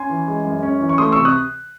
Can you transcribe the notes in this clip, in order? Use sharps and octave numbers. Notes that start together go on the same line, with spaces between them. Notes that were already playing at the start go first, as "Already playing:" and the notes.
Already playing: C#4 G#5 C6
E3
G#3
F#2
C#4
E3
C#6
A3 C6 D#6
C3 C#6 E6
D#6 F#6